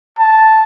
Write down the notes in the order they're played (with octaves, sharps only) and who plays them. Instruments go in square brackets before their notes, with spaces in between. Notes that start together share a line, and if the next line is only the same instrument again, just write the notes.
[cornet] A5